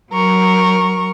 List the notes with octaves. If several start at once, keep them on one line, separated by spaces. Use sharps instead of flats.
F#3 A#4 C#6